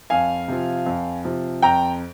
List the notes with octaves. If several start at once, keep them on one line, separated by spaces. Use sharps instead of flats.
F2 F5 G#5
C3 F3
F2
C3 F3
F2 G5 A#5